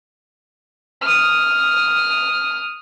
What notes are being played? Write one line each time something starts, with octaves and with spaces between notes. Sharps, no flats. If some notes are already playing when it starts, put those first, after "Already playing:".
D#6 F6